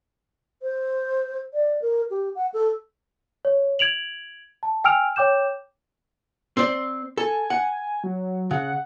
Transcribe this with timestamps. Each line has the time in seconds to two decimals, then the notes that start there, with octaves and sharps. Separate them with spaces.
0.62 C5
1.53 D5
1.82 A#4
2.10 G4
2.35 F#5
2.54 A4
3.45 C#5
3.79 G#6 D7 F7 F#7
4.63 A5
4.84 G5 G#5 E6 F6 D7 F7
5.16 C#5 G5 D6 G6 E7
6.57 C4 C5 D5
7.17 A4 G#5
7.50 F#5
8.04 F#3
8.51 C#3 F#5